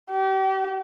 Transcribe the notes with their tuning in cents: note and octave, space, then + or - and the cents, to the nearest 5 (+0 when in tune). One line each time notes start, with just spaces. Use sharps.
G4 -35